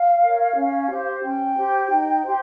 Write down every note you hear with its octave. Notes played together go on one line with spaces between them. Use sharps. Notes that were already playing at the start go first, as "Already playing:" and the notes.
Already playing: F5
A#4 C#5
C#4
G4 C5
C#4 G5
G4 C5
D#4
G4 C5